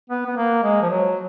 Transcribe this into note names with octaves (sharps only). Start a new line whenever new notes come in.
B3
B3
A#3
G#3
F3
F#3